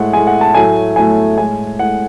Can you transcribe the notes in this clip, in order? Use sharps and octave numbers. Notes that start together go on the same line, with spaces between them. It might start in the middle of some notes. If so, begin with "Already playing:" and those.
Already playing: A2 G#3 F#5
A2 G#3 G#5
F#5
A5
A2 F#3 A3 G#5
A2 F#3 A3 G#5
A2 G#3 G#5
A2 G#3 F#5